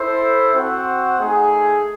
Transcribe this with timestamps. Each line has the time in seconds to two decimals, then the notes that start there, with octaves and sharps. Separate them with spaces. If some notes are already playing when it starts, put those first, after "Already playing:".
Already playing: E4 A4 C5
0.55 C4 F#4 C5 F#5
1.19 A3 D#4 G#4